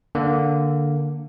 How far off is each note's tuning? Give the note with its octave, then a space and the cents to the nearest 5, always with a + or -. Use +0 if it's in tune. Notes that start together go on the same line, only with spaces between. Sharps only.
D3 +0 A#3 +0